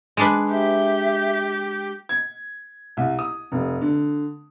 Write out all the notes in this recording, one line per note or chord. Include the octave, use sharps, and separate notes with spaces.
G#3 D4 B4
G4 E5
G#6
C2
D#6
F1
D3